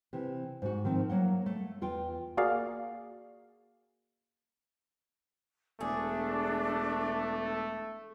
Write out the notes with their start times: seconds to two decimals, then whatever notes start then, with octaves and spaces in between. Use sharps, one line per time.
0.13 C3 E3
0.62 G#2 F#4
0.85 D#3 F3 C4
1.09 F#3 A#3 F#5
1.46 A3
1.81 E2 F4 G5
2.37 A#3 F#4 G#4 D5 F5
5.81 E1 A3 D4 G#4